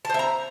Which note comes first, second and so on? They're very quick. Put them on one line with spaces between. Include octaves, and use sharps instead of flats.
A5 C5 E5 A#5